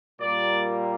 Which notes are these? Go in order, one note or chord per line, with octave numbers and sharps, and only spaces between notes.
A#2 G3 A#3 D5